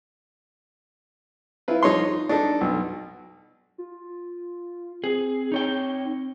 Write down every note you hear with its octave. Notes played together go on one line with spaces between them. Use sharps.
E4 F4 B4
F3 D#4 C#5 C6
D4 D#4 A4
B1
F4
C4 G#4
D#4 C#5 G5